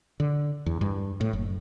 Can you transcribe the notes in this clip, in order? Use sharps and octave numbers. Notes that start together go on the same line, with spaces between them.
D3
E2
G2
A2
F#1